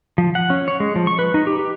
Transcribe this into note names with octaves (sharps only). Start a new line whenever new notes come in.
F3
F#5
C#4
C#5
G#3
F3
C#6
B4
D#4
G4
G4